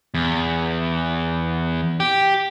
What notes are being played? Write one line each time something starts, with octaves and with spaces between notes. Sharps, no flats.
E2
G4